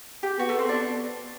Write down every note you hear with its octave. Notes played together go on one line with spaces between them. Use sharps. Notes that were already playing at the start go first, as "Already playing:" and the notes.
G4
B3 F#4
A3
C4
D4